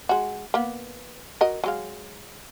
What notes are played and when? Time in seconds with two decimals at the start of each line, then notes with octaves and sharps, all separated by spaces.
0.09 G#3 F#4
0.54 A#3 B3
1.41 F#4 A#4 D#5
1.64 F#3 G#3 F5